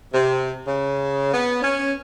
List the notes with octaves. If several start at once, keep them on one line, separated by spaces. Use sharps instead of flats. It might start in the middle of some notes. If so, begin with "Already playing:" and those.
C3
C#3
B3
C#4